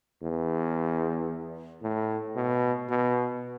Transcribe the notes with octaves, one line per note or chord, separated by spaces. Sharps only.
E2
A2
B2
B2